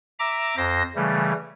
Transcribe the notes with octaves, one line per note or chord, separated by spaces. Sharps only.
E5 A#5 D6
F2 C5 A#6
C#3 E3 G3 A3